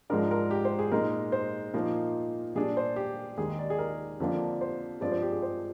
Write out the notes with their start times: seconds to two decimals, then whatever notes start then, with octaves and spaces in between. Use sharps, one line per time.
0.10 G#2 F3 G#3 D4 A#4
0.31 A#4
0.51 G4
0.65 C5
0.79 G#4
0.91 A#2 G#3 D#4 A#4
1.32 C5
1.74 A#2 F3 A#3 D#4
2.55 A#2 G3 D4 G#4
2.77 C5
2.96 G4
3.37 D#2 D#3 G#3 D#4 G#4
3.59 D5
3.70 G#4
3.78 A#4
4.20 F2 D3 F3 A#3 D4
4.61 C5
5.01 G2 F3 G#3 C4 D5
5.11 C5
5.22 G4
5.32 G#4
5.42 C5